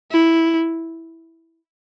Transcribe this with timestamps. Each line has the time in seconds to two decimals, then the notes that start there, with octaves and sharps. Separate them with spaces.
0.11 E4